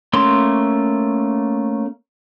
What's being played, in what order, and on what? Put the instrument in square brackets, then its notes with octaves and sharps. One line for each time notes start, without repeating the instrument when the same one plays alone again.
[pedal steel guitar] A3 A#3 C#4 C6